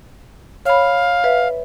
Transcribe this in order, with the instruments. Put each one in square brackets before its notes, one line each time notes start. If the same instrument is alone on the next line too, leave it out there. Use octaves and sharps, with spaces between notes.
[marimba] C#5 B5 [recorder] F5
[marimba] B4 E5